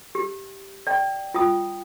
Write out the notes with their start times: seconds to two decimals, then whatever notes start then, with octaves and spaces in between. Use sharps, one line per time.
0.15 G4
0.87 D5 G5
1.34 F4 G5 D#6